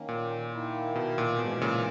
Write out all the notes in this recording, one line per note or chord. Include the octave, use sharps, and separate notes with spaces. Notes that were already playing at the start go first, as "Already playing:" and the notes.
Already playing: D#3 A#3 C#4
A#2
D#3 A#3 E4
B2
A#2
G#2 B2 E3 G#3
A#2 C#3